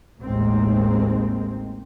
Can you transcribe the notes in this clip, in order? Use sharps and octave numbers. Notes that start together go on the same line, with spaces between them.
A1 D#2 G#3 A#3 C4